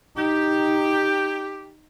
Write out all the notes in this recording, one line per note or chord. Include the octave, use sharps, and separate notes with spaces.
D#4 G4